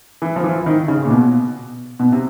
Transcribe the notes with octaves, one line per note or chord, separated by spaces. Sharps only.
E3
F3
E3
D#3
C#3
A#2
B2
B2
C3